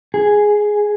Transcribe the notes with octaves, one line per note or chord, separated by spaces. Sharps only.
G#4